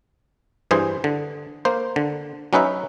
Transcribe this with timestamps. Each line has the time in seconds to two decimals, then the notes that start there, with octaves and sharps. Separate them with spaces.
0.71 G2 E3 G#4 C5
1.04 D3
1.65 A#3 C5
1.96 D3
2.53 F#3 C#4 D#4 B4 E5